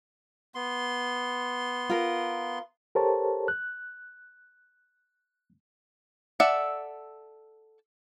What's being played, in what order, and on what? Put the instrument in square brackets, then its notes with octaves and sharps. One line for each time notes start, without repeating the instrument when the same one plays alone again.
[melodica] B3 C6
[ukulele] F4 A#4
[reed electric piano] G4 A4 A#4 C5 C#5 A5
F#6
[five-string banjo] A4 D5 E5 F#5